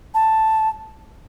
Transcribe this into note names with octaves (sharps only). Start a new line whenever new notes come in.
A5